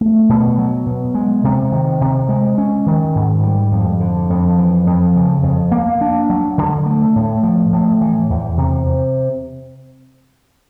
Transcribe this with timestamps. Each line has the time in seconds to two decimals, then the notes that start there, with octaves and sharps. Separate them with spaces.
0.01 A3
0.29 B2
0.58 F#3
0.86 B2
1.14 G#3
1.44 C3
1.72 D#3
2.01 C3
2.29 G#3
2.58 C#4
2.86 D#3
3.15 G#2
3.43 G3
3.72 F2
4.00 D3
4.30 F2
4.58 E3
4.87 F2
5.16 C#3
5.43 F2
5.72 A#3
6.01 D4
6.30 F#3
6.58 D3
6.86 A3
7.16 A2
7.43 F3
7.72 A2
8.01 E3
8.30 E2
8.57 C3